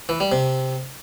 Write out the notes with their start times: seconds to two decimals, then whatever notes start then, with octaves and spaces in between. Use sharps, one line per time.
0.09 E3
0.20 G3
0.32 C3